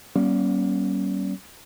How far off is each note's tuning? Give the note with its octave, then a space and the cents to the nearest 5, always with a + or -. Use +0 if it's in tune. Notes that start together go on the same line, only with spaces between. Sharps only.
G3 -35 A#3 +40 C#4 +0